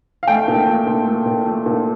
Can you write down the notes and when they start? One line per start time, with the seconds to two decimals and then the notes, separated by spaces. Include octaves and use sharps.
0.23 F5
0.27 A3 G5
0.48 A#2
0.67 A3
0.86 A#2
1.06 A3
1.25 A#2
1.46 A3
1.66 A#2